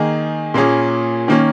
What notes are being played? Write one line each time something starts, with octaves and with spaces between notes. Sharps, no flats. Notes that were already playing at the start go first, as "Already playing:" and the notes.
Already playing: D#3 A#3 D#4 G#4
A#2 A#3 C#4 G#4
D#3 A#3 C#4